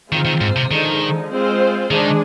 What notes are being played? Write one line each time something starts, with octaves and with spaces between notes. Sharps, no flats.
D#3 G#3 C4 F4 C5
D#3
G#2
C3
D3 D#3 F3 G#3 D#4
G#3 C4 F4 C5
D#3 G#3 D4 G#4